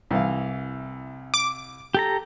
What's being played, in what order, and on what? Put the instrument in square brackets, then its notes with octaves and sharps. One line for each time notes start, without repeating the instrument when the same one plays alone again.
[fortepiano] C2 E3 F5
[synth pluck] D6
[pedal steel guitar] G4 A4 A#5